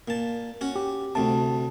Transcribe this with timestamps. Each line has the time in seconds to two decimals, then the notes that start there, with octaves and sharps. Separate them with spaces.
0.08 A#2 A5
0.61 C#4 F#4
0.76 G4
1.15 D2 C3 F#4 A5